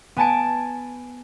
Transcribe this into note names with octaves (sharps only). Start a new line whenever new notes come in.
B3 G#5 A5 D7